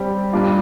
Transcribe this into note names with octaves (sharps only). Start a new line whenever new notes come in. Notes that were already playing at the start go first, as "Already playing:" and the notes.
Already playing: G3 C4 G4
A#2 G3 D4 F4